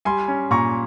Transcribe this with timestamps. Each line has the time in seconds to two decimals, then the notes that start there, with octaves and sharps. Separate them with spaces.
0.05 G3 G#5 C6
0.28 C#4
0.51 A#2 A#5 C#6